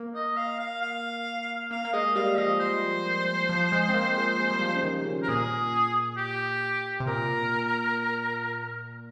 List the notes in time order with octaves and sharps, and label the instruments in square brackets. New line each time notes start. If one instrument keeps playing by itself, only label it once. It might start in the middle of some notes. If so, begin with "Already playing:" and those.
Already playing: [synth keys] A#3
[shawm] D#5
F5
F5
F5
[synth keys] A#3 [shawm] F5
[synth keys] A#3
[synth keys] G#3 [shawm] D#5
[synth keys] G3 [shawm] F5
[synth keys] F3 [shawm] D#5
[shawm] C5
[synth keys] F3
G#3
C4
A#3
G#3
G#3
G3
F3
C#3
D#3
C#3
[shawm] A#4
[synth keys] A#2 [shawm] G#4
[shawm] G4
[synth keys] C3
[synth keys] A#2 [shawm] A#4